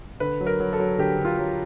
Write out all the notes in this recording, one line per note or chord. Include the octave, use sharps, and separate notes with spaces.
D3 B4
F#3
A#4
F#3
A4
F#3
D3 G4
D3
F4
F#3